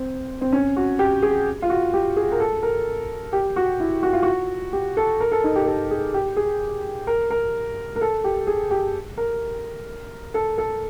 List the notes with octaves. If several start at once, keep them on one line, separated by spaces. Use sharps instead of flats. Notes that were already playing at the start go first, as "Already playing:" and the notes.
Already playing: C4
C4
C#4
F#4
G4
G#4
F4
F#4
G4
G#4
A#4
A4
A#4
G4
F#4
E4
F#4
F4
F#4
G4
A4
A#4
A4
D#4
G4
A4
G#4
G4
G#4
A#4
A#4
A#4
A4
G4
G#4
G4
A#4
A4
A4